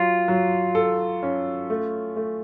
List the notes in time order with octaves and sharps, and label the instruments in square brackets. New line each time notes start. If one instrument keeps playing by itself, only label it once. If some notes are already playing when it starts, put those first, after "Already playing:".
Already playing: [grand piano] F#3 [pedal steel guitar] F4
[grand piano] F#3
A4
C#4
A3
A3